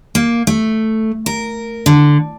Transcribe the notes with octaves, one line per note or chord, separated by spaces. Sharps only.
A#3
A3
A#4
D3